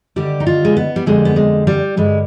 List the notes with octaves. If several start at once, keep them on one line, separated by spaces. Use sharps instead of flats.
D#2 D3 G3 G4
D#4
F4
G#3
B3
G3
F2 D3 G3 G#3
B3
G#3
G3
G2 D3 G3 G#3